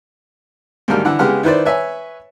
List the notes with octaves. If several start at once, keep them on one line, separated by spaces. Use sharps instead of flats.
D2 G#2 D#3 G3 A#3 F6
D3 E3 F#5
C#3 G#3 B3 G4 F#5 F6
D#3 E4 B4 C5 D5
B4 C#5 E5 G#5